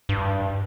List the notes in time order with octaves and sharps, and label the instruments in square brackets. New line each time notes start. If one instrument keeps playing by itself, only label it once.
[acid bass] G2